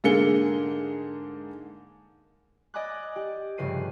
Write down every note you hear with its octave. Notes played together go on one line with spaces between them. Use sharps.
G#2 D3 A#3 G#4 C#7 G7
D5 D#5 G#5 B5 D6 F#6
G4
F1 G2 C#3 B4 C7 D#7